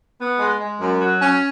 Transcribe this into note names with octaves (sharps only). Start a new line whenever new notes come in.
B3
G#3
G#3
F#2
F#3
C#4